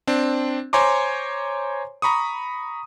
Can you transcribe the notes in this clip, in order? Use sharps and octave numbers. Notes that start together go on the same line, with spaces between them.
C4 D4
C5 C#5 G#5 A#5 C6 D6
A#5 B5 C#6 D#6